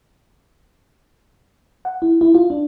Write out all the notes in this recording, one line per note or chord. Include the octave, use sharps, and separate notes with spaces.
F#5
E4
E4
F4
D4